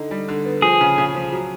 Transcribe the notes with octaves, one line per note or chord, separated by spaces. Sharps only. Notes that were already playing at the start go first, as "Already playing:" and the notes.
Already playing: D3 D#4
G3
D3
B3
F3 G#4
C#3
C#3
F3
F#3